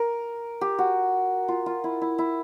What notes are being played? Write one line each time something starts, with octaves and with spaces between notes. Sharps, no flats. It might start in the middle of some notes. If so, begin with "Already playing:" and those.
Already playing: A#4
G4
F#4
F4
F4
E4
E4
E4